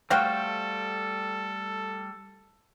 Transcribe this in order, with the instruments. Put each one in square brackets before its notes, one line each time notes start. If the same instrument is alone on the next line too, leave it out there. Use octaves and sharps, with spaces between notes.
[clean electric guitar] G3 A3 C5 [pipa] F#4 F5 G5 [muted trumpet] A4